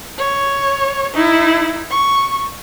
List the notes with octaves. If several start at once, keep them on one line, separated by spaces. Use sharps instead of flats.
C#5
D#4 E4
C#6